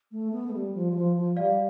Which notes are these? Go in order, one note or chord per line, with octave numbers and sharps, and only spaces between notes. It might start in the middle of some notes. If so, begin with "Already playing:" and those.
A3
B3
A3
G3
F3
G3
F3
F3
G3 D5 F5